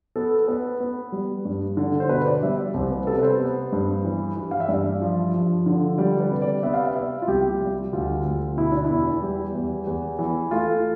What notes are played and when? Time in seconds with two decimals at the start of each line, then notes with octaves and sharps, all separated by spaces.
0.16 B3 A4
0.48 B3 B4
0.80 B3
1.12 G3
1.45 G2
1.77 D3
2.00 C5
2.09 B2 B4
2.26 D5
2.43 G3 E5
2.59 D5
2.74 C2 C5
2.91 B4
3.07 C3 A4
3.19 B4
3.23 C5
3.40 B3
3.72 G2
4.04 E3
4.36 E3
4.51 F5
4.60 E5
4.69 G2 D5
5.01 F3
5.34 F3
5.66 D3
5.98 G3 D5
6.20 B4
6.31 C3
6.42 D5
6.63 B3 E5
6.74 F5
6.84 E5
6.96 B3 E5
7.22 F4
7.28 C2 G4
7.60 G3
7.93 D2 F4
8.25 D2
8.57 B2 E4
8.71 D4
8.84 E4
8.90 E2
9.22 G3 G4
9.55 E2
9.87 E2
10.19 E3
10.51 A3 F4